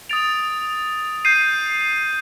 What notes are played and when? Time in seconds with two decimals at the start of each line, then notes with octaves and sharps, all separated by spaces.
0.09 D#6 A6 D7 F7
1.25 G6 C7 D#7